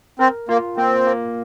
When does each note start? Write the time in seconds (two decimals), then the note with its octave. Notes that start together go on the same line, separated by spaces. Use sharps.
0.19 C4 A#4
0.49 A#3 F4
0.77 A#3 C4
1.07 A#3